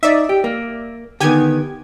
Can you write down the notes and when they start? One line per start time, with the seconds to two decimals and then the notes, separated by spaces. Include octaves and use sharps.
0.03 D#4 D5 E5
0.29 G4
0.44 A#3
1.20 D3 D#3 B3 G4 G#5 G#6